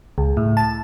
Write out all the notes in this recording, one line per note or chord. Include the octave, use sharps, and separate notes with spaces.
C#2
A2
A5